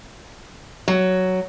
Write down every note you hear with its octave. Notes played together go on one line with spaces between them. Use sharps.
F#3